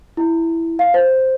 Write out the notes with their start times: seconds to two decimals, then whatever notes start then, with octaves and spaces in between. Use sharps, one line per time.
0.17 E4
0.79 F5
0.94 C5